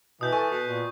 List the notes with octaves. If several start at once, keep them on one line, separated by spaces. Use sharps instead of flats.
B2 E3 D#6 G6
A4 G#5 C#6
B2
A#2